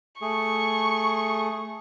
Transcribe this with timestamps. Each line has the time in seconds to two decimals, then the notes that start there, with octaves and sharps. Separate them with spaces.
0.21 A3 G#4 C#6